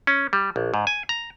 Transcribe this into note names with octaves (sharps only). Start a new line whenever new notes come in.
C#4
G3
A#1
G#2
G#5
A#5